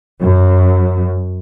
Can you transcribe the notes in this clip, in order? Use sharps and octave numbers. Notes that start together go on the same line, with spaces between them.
F#2